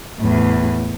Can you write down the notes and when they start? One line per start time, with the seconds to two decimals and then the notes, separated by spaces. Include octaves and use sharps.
0.20 E2 A2